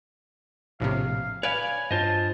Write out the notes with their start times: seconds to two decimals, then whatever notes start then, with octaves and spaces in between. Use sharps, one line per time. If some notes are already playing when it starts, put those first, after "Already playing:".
0.80 A#1 A2 C3 F5
1.43 B4 C#5 D5 F5 G#5 B5
1.91 G2 F4 C5 D#5 A5